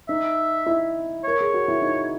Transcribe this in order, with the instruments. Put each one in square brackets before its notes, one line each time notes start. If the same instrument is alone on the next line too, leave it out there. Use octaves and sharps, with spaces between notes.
[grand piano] D#4 [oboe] E5
[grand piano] E4
[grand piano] A#4 [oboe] C#5
[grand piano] G#4
F#4
E4
D#4